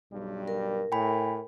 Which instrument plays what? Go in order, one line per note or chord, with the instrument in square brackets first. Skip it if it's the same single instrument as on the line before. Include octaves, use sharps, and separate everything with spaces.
[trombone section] B1 G2 G3
[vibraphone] A#4
[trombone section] A2 [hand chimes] G5 G#5 B5